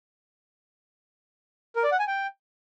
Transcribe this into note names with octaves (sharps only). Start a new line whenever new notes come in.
A#4
D5
F#5
G#5
G5